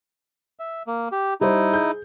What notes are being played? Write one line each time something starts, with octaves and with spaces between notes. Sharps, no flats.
E5
A#3
G4
G3 D#4 E4 C5
G#4 G6